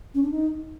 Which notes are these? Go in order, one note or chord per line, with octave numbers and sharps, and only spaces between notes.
C#4
D4
D#4